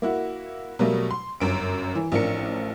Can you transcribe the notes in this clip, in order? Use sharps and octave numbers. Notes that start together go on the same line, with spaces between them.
A#3 E4 F#4
B2 F#3 G3 A3 A#3
C6
G1 F#2 D7
E3
A1 F3 C4 D4 A#4 C#7